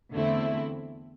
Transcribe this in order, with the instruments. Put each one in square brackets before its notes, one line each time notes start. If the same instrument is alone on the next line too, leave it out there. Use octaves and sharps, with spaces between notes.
[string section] E2 D3 A3 C4 E4